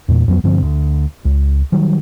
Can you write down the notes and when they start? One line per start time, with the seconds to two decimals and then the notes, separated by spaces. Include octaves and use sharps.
0.08 E2 A#2
0.28 F2 F#3 B3
0.43 G2 D3 F3 C4
0.62 D2
1.25 C#2
1.72 D#3 F#3 G3